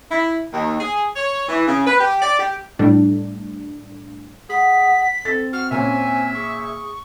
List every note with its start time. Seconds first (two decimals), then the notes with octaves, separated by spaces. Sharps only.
0.10 E4
0.53 D#2
0.80 G#4
1.16 C#5
1.48 E3
1.67 C#3
1.87 B4
2.00 G4
2.22 D5
2.39 G4
2.79 A2 G3 A3 D4
4.49 G#4 F#5 B6
5.25 C4 A4 A6
5.52 F#4 F6
5.71 A#2 C#4 E5 G#5
6.34 G#4 C#6